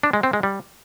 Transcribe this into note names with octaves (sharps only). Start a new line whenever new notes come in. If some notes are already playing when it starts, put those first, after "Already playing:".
D4
G#3
C4
G#3
G3